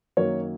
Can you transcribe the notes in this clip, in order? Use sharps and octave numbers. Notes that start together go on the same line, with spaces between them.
F#2 D#3 F#3 A#3 C#5